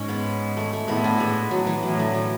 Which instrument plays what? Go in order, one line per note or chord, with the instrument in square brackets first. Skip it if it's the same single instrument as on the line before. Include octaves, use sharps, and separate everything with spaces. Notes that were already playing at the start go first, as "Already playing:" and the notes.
Already playing: [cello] G#2 [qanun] C#4
[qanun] G#3 B3
A3
A3
[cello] A2 [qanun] G#3 B3
[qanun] B3 D4
G#3
[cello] A2 [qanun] F#3
[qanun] E3
[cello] A2 [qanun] F#3
[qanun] D3
E3